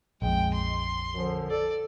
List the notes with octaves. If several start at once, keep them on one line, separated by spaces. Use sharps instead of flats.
A#1 F2 G#3 G5
C6
F#2 D3 F3
A4 D5